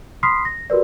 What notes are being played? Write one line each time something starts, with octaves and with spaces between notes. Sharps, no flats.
B5 C6 D#6 F6 B6 C7
A#6
F#4 G4 A#4 B4 D5